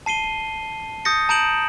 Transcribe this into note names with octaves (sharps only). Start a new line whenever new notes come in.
A5 C7 D#7 G7
D#6 G6 A6 A#6 C#7
A5 A#5 G6 D7 E7 F#7